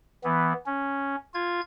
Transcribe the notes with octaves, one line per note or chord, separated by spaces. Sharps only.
E3 B3
C#4
F4 G#6